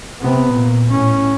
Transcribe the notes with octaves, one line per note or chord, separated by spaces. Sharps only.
C3 B3
A#2
A2 C#4